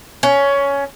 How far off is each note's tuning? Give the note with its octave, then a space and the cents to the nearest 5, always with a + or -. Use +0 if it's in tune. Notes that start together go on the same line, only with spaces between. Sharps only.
C#4 +15